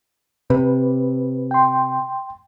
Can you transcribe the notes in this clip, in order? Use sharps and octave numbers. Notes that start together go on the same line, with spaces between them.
C3 B4
G5 C6